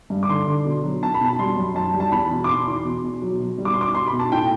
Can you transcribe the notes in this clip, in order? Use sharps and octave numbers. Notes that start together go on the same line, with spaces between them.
G2
D6
D3 C6
D3
B2
F#3
B2 A5
B5
B2 A5
G3 C6
F#2
F#2 A5
G3
A5
E2 B5
B2
D6
B2 C6
E2
B2
B2
F#3
B2
G3
D6
C6
B2 D6
B2 C6
B5
B2
A5
A2 G5